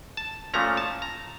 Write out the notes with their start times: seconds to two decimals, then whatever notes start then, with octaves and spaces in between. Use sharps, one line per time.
0.17 A5
0.54 A#2 F3 A3 C#4 A#5
0.77 A5
1.02 A#5